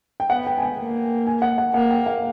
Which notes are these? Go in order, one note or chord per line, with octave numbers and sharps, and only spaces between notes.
G5
B3 F#5
G5
G#5
G5
A#3
G#5
F#5
F#5
A#3 F#5
G5
F5